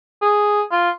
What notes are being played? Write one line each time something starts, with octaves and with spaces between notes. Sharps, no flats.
G#4
F4